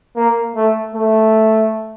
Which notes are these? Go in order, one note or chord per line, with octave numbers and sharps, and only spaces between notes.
A#3
A3
A3